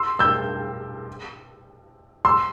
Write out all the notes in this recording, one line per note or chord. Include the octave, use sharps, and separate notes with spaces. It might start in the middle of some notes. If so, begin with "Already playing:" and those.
Already playing: C6 E6
E6 G6
C6 E6